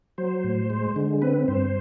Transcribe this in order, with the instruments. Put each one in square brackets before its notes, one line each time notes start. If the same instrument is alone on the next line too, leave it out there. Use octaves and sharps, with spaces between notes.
[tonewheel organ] F#3 C5
A2
G#3
D3
C4 B4
G2 C5